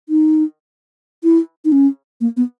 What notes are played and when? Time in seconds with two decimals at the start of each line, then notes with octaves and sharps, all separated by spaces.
0.09 D#4
1.23 E4
1.65 D#4
1.72 C#4
2.21 A#3
2.37 B3